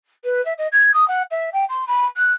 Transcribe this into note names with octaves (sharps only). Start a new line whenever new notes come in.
B4
E5
D#5
G#6
D#6
F#5
E5
G5
C6
B5
F#6